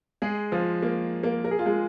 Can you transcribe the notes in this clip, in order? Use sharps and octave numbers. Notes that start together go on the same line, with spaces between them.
G#3 G#4
F3 F4
A#3
A#3 A#4
A#4
G#4
F4
G#3 G#4